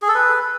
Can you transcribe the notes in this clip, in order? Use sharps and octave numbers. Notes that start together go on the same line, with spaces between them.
G#4
A4
B4